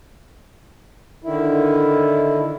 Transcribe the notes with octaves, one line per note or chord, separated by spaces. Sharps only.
D3 D#3 E4